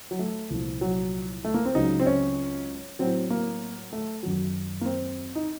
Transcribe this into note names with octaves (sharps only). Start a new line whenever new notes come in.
F#3
A3
C2 A#2 F3
F#3
A3
A#3
C4
C#2 C#3 F#3 D#4
C4
C#4
A2 F#3 C4
A#3
A3
F#2 D#3 F#3
A#3
C4
D#4